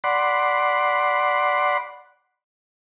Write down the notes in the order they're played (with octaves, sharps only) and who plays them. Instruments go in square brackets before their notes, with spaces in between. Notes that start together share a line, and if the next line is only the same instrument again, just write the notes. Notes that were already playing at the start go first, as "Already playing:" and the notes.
[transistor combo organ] D5 F#5 B5 C6